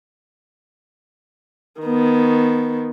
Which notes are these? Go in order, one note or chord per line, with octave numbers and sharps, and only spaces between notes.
D#3 B3